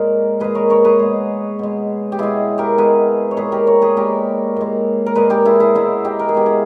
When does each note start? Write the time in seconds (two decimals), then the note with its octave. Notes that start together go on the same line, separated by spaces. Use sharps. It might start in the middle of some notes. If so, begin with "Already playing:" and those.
Already playing: A#2 G#3 A#4 C#5
0.40 A#2 G#3 G#4 B4
0.55 A#4 C#5
0.70 A#4 C#5
0.85 G#4 B4
0.99 B2 G#3
1.59 B2 G#3
2.12 G4
2.18 B2 G#3 E4 G#4
2.58 G4 A#4
2.78 B2 G#3 G#4 B4
3.31 C#5
3.37 A#2 G#3 G#4 B4
3.52 G4 A#4
3.67 A#4 C#5
3.82 G#4 B4
3.97 A#2 G#3 G4 A#4
4.56 A#2 G#3
5.06 A#4
5.15 A#2 G#3 G#4 B4
5.30 G4 A#4
5.45 E4 G#4
5.60 E4 G#4
5.75 B2 G#3 E4 G#4
6.05 D#4 G4
6.19 A#4
6.29 G#4
6.35 B2 G#3 G4
6.46 E4 G#4